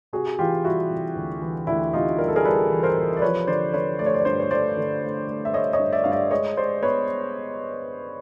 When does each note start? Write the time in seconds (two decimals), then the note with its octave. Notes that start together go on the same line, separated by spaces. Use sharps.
0.13 C3 F#4 G#4
0.39 E3 F4 G4
0.64 G3 E4 F#4
0.90 C3
1.16 D2
1.42 E3
1.67 D2 E4
1.93 C3 D#4 F4
2.19 G3 A#4
2.28 A4
2.36 G#4 A#4
2.45 G3 A4 B4
2.71 E3
2.83 A#4 C5
2.96 C3
3.17 D5
3.22 F3 B4 C#5
3.47 D3 C5 D5
3.73 D3 B4 C#5
3.99 A3 D5
4.06 C#5
4.14 C5 D5
4.21 C#5
4.25 G2 C5 D5
4.40 C#5
4.51 A3 C5 D5
4.77 D3
5.03 A3
5.28 A3
5.45 E5
5.54 A3 C#5 D#5
5.73 C#5 D#5
5.79 G2
5.92 D5 E5
6.04 G2 F5
6.12 D5 E5
6.31 G#3 C#5 D#5
6.57 G#3 C5 D5
6.82 B3 B4 C#5